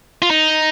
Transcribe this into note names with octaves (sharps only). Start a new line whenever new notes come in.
F4
D#4